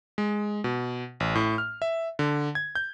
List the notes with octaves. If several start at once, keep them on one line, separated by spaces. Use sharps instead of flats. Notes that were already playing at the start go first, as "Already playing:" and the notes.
G#3
B2
A1
A2
F6
E5
D3
G#6
G6